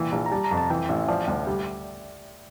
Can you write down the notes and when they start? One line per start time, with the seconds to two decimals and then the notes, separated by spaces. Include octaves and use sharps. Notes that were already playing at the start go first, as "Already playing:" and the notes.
Already playing: A#2 E3 G5
0.12 A#1
0.26 A#5
0.31 G3 A5
0.44 A#5
0.51 F2
0.57 A5
0.70 E3 G5
0.89 A1 E5
1.08 F3 D5
1.28 D2
1.47 G3